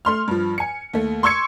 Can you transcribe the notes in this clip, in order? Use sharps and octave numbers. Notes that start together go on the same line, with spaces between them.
A3 C6 F6
G2 F3
G#5 C#7
D#2 A3
C6 C#6 E6 G#6 C#7